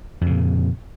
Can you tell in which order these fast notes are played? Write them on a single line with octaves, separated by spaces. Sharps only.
F2 C#3 A#2